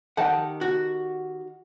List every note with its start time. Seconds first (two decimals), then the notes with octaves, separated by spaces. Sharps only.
0.17 D#3 G4 F#5 A5
0.61 F#4